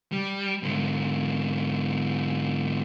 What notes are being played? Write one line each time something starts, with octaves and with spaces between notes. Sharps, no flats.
G3
G#2 D3